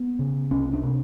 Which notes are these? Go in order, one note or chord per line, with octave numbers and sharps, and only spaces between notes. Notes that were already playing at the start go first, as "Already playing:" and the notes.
Already playing: B3
C#3
C2 C#4
D4
C3